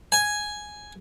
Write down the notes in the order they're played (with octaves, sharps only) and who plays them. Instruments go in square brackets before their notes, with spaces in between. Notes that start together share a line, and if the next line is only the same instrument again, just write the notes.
[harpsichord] G#5